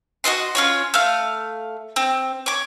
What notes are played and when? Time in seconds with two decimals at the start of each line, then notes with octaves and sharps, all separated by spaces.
0.24 F#4 A#4 D#5 C6
0.55 C#4 F4 C#5
0.94 A3 F5
1.96 C4
2.46 C#5 D6